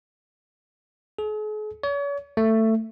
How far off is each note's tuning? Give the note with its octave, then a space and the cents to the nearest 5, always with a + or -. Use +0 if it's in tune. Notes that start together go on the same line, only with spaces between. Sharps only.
G#4 +45
C#5 +40
A3 +15